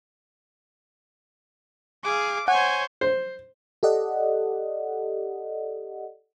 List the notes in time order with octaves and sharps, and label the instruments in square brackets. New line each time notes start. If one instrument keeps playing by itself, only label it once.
[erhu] G#4 [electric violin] F5 D6
[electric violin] C5 C#5 [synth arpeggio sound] F#5 [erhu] G#5
[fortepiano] C5
[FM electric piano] G4 A4 D5 D#5 F#5